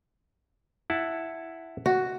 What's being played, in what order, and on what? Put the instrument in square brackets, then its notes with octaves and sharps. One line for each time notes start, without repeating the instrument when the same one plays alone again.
[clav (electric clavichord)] E4 F#5 A5
[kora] F#4